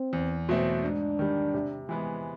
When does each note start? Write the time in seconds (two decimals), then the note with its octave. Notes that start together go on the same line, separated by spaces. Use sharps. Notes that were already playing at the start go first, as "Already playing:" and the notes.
Already playing: C4
0.13 E2
0.49 B2 F#3 A3 C4
0.83 G#2 D4
1.19 D#3 G3
1.54 C3
1.89 E3 G#3 B3